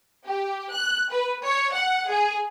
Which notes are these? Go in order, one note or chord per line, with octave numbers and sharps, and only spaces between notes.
G4
F#6
B4
C#5
F#5
G#4